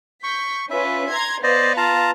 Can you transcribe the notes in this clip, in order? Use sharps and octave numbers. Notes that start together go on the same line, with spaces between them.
C#6 G6 B6
C#4 F4 B4 E5
A#5 C6 G#6
B3 B4 C5 D5 D#5 F5
F4 A5 A#5